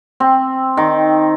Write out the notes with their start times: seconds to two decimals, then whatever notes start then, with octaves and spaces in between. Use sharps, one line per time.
0.20 C4
0.77 D#3